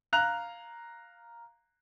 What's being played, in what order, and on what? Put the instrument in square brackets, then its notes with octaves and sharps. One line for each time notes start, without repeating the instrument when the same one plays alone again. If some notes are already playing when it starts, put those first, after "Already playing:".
[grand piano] F5 A#5 F#6 F7